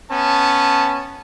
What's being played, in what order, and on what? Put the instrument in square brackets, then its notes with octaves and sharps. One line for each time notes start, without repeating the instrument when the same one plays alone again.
[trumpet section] B3 C#4 A5